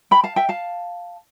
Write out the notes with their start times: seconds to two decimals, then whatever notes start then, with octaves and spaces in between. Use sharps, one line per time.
0.11 G5 B5
0.24 F5 A5
0.36 E5 G5
0.49 F5 A5